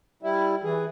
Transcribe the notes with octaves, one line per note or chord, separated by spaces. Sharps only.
G3 E4
E3 G#4